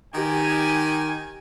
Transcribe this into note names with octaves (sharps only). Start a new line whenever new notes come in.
D#3 G4 G#5